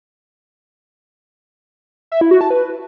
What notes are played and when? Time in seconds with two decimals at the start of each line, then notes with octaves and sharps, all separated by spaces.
2.12 E5
2.21 E4
2.31 F#4
2.41 A5
2.50 B4